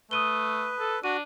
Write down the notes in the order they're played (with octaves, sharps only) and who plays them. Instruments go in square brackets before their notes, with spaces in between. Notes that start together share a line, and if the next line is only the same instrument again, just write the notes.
[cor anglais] A3 [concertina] B4 [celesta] D#6 D#7 G7
[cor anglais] A4
[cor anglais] D4 [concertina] F#4 [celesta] D#7